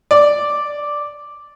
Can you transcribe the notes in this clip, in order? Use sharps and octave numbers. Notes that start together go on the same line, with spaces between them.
D5